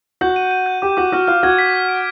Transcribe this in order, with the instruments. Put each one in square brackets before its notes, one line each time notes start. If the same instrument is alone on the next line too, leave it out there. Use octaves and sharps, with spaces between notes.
[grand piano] F#4 F#5 [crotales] G6
[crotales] D#7
D#7
G6
[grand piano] G4 G5 [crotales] D6
[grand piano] F#4 F#5 [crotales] D6
[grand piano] F#4 F#5 [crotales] F6
[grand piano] F4 F5 [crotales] F6
[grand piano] F#4 F#5 [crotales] G#6
[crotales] B6
F6
D7